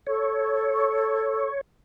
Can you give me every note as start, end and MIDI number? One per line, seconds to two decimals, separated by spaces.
0.07 1.46 69
0.07 1.61 73